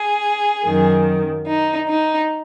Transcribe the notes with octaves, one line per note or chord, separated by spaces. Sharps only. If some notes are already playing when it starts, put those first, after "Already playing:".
Already playing: G#4
F#2 D#3
D#4
D#4